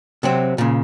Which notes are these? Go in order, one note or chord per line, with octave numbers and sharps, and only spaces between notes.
C3 F#3 C4
A#2 C#3